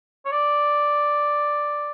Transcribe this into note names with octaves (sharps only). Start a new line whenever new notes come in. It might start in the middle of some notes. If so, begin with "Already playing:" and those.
C#5
D5